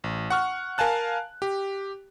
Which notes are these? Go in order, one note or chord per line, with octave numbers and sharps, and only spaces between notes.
A1
F#5 C#6 F6
A#4 F5 G#5 A5 F#6
G4